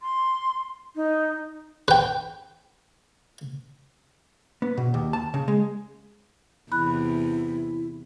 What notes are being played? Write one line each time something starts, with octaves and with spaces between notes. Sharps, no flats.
C6
D#4
B4 G5
B3
B2
D#2
A5
C#3
G#3
E2 C3 E4 B5 F#6